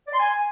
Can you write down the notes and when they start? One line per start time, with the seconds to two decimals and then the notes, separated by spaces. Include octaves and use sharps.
0.07 D5
0.13 C6
0.20 G#5